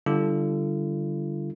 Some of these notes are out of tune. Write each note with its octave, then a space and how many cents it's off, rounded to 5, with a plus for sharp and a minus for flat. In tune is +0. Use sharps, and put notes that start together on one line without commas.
D3 +0 G3 +0 F4 -40